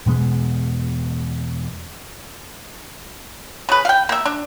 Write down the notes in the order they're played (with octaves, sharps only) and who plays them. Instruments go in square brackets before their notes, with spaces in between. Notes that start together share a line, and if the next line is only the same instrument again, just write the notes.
[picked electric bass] E2 B2 G#3 B3
[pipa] C#3 B4
F5 G5
A#3 E5
D4